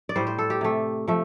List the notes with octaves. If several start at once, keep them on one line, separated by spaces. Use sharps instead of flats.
D5
A2 G3 C5
C5
A4
G4
C3 A3
F3 A3